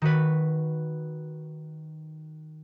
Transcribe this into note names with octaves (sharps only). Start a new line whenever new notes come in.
D#3 F#4 B4